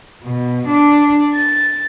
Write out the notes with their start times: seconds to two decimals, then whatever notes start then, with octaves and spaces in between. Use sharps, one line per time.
0.24 B2
0.68 D4
1.34 A6